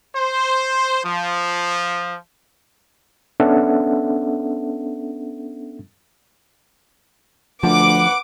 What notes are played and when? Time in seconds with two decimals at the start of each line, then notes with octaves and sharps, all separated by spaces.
0.14 C5
1.04 F3
3.40 B3 C#4 D4 A4 E5 F#5
7.63 D2 F3 B4 F#5 D6